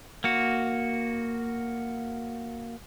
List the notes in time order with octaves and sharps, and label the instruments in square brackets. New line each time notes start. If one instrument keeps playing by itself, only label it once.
[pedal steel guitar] A#3 F#4